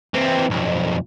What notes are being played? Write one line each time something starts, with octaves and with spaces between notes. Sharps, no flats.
E3 C4
B1 F2